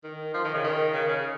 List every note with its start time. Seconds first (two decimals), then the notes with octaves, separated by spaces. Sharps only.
0.04 D#3
0.34 F3
0.45 D#3
0.54 C#3
0.64 D#3
0.94 C#3
1.09 C#3